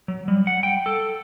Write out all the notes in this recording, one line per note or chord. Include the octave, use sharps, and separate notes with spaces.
F#3
G3
F#5
G5
A4